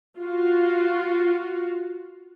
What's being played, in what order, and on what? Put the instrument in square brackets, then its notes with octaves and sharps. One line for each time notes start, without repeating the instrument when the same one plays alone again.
[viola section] F4 F#4